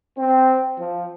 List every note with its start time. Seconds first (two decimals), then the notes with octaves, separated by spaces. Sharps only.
0.17 C4
0.79 F3